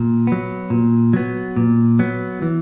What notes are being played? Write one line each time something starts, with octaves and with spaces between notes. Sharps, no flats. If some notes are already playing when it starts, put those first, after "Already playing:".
Already playing: A#2
F#3 B3
A#2
F#3 B3
A#2
F#3 B3
E3